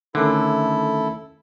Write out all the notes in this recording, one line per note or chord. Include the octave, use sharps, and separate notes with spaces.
D3 D#3 A3 C#4 E4 A4